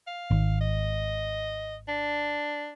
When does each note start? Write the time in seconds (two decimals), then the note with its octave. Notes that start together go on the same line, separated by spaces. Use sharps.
0.07 F5
0.31 G#1
0.61 D#5
1.88 D4